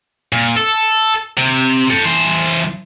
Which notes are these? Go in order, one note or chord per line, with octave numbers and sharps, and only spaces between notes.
A#2
A4
C3
A4 G5
E3 C5